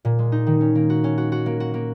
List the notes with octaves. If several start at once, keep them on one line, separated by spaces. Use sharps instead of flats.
A#2
G#3
D#4
D#3
C#4
A#3
F#4
C#4
F#4
F#4
A#3
F#4
A#3